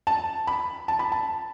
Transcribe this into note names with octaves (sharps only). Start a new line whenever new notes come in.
A5
B5
A5
B5
A5